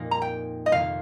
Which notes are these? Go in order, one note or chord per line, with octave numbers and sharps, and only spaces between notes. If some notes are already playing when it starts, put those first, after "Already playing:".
Already playing: F2 A#2 A#3 C4 D#4 G4
A#5
G5
D#5
F2 C3 D#3 A#3 F5